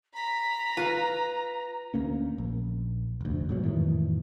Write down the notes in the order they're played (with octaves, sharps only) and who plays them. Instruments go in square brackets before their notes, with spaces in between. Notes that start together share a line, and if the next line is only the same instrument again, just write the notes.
[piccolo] A#5 [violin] B5 B6
[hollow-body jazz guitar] F4 F5 [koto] B4
[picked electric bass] D2 A#3 C#4
A#1
F1 D2
G#2 B2 F#3
F2 A2 D#3 E3